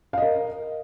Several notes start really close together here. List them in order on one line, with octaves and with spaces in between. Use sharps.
F5 D#5 A#4